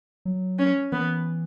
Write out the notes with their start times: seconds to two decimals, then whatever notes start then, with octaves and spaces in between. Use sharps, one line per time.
0.25 F#3
0.59 C#4
0.92 E3 B3